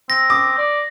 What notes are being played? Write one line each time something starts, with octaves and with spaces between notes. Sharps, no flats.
C4 A#6
D6 D#6
D5